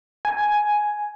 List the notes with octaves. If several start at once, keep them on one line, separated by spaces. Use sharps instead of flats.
G#5